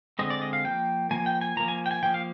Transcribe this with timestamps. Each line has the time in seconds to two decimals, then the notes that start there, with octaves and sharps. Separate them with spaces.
0.19 D3 G#3 C4 D#5
0.30 D5
0.42 D#5
0.53 F5
0.64 F3 A#3 G5
1.11 F3 A#3 G#5
1.26 G5
1.41 G#5
1.57 F3 A#3 A#5
1.68 G#5
1.86 G5
1.91 G#5
2.03 F3 A#3 G5
2.14 F5